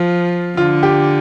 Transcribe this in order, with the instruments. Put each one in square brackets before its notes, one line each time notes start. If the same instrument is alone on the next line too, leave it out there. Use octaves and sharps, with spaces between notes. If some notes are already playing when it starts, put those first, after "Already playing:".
Already playing: [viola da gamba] F3 [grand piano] F4
[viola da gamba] D3 [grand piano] F4
[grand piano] G4